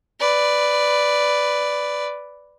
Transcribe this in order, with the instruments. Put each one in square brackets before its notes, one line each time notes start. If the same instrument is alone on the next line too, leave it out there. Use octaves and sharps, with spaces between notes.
[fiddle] B4 D5